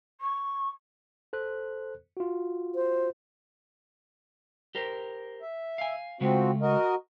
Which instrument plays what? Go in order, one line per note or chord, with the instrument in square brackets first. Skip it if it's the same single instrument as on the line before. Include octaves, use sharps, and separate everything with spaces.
[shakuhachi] C#6
[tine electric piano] A4 C5 F#6
F4 F#4
[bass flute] C5
[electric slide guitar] G4 A#4 C5
[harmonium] E5
[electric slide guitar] F5 G#5
[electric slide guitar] C#3 G#3 A3 [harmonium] F3 C4 F#4
[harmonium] F#4 A#4 D#5